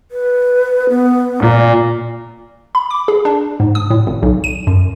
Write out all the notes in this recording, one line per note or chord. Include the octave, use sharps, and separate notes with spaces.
B4
B3
A#2 D5
B5
D6
G#4
D4
G#2
D#6
A2
G#1
B1
D#7
F#2